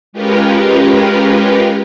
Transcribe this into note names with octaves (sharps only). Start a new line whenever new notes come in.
G#3 C#4 F4 G4 A#4 B4